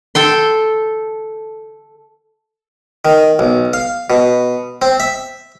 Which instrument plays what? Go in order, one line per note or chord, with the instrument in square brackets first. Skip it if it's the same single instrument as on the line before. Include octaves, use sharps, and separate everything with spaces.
[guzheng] A4 G5 C6
[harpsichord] D#3
B1
F5
B2
C4
E5